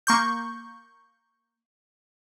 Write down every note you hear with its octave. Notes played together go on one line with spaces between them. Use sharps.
A#3 C#6 G6